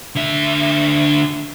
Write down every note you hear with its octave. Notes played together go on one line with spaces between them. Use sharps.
D3 E5